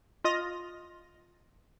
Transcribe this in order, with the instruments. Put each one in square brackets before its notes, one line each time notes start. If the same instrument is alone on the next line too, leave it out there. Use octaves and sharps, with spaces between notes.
[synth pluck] F4 D#5 D#6 A#6